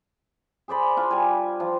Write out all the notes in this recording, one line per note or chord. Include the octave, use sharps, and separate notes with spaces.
G#4 C5 D5 B5
D4 F4
G3 G#5
F3